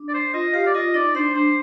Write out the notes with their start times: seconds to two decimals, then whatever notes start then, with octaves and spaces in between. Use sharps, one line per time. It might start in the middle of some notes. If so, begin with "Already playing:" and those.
Already playing: D4
0.09 D5
0.14 C5
0.34 F4 D#5
0.54 G4 F5
0.66 D5
0.74 F4 D#5
0.94 D#4 D5
1.15 D4 C5
1.35 D4 C5